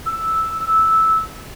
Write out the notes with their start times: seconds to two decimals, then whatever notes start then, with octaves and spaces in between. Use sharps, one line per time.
0.06 E6